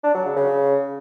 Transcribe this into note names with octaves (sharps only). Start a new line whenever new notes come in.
D4
F#3
C#3
C#3